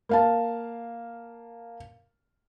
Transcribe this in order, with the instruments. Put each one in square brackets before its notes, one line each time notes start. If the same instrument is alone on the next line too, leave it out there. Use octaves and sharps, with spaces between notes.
[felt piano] A#3 F5 A5